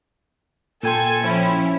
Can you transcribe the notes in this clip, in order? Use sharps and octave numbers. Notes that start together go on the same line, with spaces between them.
A#2 A4 G5 G#5 C6 G#6
F3 C#4 E4